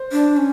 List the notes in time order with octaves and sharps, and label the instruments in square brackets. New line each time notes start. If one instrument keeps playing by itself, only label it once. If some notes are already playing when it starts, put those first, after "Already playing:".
Already playing: [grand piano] C5
[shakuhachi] D4
C#4